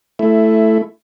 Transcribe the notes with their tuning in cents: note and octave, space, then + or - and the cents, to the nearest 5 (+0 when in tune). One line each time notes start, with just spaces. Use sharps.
A3 +0 E4 +10